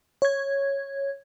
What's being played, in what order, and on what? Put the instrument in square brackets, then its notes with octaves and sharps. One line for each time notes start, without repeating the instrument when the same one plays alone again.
[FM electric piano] C#5 G#6